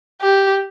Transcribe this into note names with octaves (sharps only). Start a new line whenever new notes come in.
G4